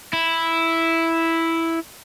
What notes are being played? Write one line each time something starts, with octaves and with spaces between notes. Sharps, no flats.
E4